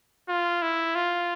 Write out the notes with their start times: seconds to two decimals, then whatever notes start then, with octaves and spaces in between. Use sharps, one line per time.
0.29 F4
0.62 E4
0.95 F4